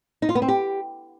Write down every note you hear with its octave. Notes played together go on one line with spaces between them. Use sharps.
D#4
F4
B3
C4
G4